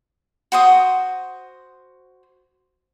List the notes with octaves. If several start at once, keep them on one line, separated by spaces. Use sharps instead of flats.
F#4 C5 D#6